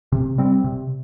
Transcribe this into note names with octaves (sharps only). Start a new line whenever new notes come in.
C3
G3 C4
C3